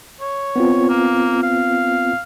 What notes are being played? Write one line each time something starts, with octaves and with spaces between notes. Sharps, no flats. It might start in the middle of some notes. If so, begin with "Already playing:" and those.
C#5
B3 C4 F4
A#3
F5